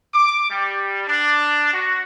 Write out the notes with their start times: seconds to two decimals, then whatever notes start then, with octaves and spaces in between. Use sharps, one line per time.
0.14 D6
0.50 G3
1.08 D4
1.73 F#4